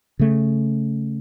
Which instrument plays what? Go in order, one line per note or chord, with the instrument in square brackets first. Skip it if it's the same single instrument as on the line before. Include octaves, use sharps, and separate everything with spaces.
[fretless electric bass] C#3 A3